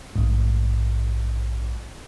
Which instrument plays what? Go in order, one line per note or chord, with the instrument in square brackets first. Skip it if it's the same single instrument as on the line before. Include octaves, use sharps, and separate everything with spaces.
[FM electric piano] A#1 G#2